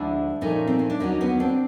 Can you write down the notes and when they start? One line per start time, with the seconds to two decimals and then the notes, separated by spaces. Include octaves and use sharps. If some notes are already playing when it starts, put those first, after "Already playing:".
Already playing: D2 D3 F3 G#3 D4 E4
0.41 A#2 F3 A3 C#4 D#4
0.67 C4
0.79 C#4
0.90 D4
1.00 D#2 D3 F#3 C#4 D#4
1.21 B3 C#4
1.40 C4 D4